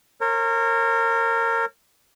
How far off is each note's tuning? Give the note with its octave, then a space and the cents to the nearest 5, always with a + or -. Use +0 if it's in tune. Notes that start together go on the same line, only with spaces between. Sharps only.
A#4 -25 C#5 -35